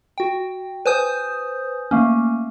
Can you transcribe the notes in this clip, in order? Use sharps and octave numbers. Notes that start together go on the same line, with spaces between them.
F#4 G5
B4 C5 G#5 D#6 G6
A3 A#3 C#4